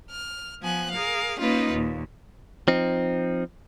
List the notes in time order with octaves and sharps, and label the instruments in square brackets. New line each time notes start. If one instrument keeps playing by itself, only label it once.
[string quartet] F6
F3 B3 G#5 F#6
G#4 A#4 F5
A#3 C#4 D#4 F4 B4
D#2 A#2
[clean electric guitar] F3 C4 D#4